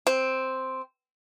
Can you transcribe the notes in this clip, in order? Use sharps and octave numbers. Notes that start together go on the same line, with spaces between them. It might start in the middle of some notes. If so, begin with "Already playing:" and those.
C4